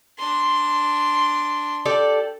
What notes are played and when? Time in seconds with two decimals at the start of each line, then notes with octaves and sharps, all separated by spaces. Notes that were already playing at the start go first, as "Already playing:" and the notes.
0.18 D4 C6
1.85 G4 A4 D5